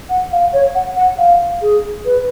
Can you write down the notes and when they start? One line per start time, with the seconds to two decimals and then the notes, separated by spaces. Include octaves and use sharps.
0.10 F#5
0.32 F5
0.53 C#5
0.75 F#5
0.96 F#5
1.18 F5
1.62 G#4
2.05 B4